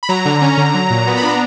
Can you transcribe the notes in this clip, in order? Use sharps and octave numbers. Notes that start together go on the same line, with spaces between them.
B5
F#3 A#5
D3
C#4
D3
F#3
A#2
B3
B5
D4
A#5